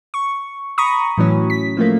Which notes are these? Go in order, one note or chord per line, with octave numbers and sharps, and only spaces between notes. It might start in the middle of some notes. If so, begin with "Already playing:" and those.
C#6
A#5 B5 C#6 D#6
A2 E3 F#3 C#4
B6
F3 A3 A#3